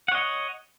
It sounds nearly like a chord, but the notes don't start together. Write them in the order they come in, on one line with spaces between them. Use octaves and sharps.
F#5 C#5 D#5